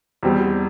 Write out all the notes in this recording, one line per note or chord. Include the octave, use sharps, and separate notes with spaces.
E2 B2 G3 C4